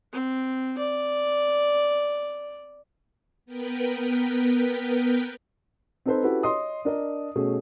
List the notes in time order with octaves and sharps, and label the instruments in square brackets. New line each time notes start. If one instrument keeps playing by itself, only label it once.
[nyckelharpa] C4
D5
[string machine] B3 A#4 B4 G5
[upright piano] C4 D#4 A4 B4 C5
C#4 E4 F#4 G4 A4 B4
C#5 D#5 C6 D#6
D4 A#4 D#5
B2 A3 C#4 G#4